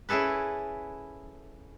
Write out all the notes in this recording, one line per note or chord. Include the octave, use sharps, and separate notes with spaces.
C#4 E4 G#4 A4 B4